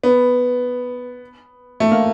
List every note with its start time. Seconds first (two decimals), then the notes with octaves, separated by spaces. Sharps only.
0.04 B3
1.80 A3
1.91 A#3